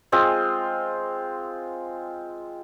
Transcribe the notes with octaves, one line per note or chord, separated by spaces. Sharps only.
G#3 C4 F4